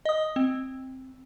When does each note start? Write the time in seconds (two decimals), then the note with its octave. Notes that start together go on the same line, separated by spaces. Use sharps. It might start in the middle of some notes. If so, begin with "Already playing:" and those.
0.05 D#5 D#6
0.36 C4